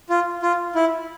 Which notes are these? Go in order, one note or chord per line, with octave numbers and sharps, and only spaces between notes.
F4
F4
E4